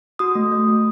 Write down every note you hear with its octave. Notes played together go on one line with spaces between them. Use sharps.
F#4 D#6
A3
A3
A3